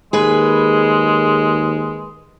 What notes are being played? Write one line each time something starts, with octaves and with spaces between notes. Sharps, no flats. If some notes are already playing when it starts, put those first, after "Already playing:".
D#2 G#3 G#4 B4